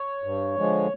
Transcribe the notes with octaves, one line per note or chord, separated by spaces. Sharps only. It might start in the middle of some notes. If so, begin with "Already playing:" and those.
Already playing: C#5
G2
D3 F3 G#3